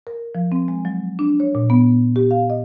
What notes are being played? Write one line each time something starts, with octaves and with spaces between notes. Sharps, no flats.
A#4
F3
C4
G#3
F#3
D4
C#5
A#2
B3
G4
F5
D#5